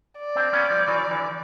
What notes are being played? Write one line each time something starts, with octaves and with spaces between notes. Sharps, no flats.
D5
C4 D4
B3 C#4
F3 G3
E3 F#3
D3 E3